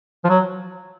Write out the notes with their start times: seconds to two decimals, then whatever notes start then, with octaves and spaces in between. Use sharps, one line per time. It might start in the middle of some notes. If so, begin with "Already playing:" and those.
0.24 F3
0.29 F#3